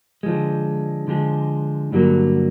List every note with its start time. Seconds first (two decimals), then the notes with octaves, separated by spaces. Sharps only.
0.23 D3 F3 G#3
1.08 D3 F3 G#3
1.92 G2 D3 F#3 A#3